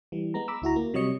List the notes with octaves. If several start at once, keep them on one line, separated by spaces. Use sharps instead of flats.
E3 G3
G#3 B3 A#5
A#5 B5 D6 E6
D2 E4 F#4 A#5
A#3
C3 F#3 G3 C#5 D#5 C#7